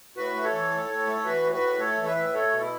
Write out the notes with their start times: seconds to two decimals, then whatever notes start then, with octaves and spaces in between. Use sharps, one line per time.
0.17 A2 F#4 B4
0.34 A3
0.44 A4 C#5
0.52 E3
0.71 A2
0.89 A2
1.07 A3
1.25 E3 F#4 B4
1.43 A2
1.52 F#4 B4
1.61 A2
1.80 A3 A4 C#5
1.97 E3
2.06 B4 E5
2.15 A2
2.34 A3 A4 C#5
2.51 B2
2.61 E4